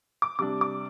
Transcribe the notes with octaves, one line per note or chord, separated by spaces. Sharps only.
D6
C3 G3 D4 D6
D6